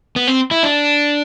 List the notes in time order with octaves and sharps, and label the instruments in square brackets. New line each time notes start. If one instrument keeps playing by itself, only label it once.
[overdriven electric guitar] B3
C4
E4
D4